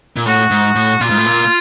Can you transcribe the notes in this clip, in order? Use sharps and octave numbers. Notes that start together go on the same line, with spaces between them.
A#2
A2 F#4
G#2
A2
A#2 F4
G#2
A2
A#2